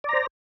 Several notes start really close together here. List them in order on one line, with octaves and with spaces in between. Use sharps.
D5 A#5 C5